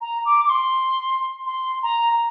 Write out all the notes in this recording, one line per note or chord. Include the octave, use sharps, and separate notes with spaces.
A#5
D6
D6
C6
C6
A#5